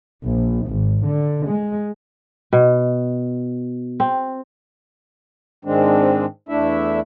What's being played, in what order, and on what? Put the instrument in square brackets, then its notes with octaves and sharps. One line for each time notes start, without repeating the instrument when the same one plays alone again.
[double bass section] A#1
G#1
D3
G#3
[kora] B2
C4
[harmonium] G#2 D#3 G#3 C4 D4
E2 A3 D4 E4 E5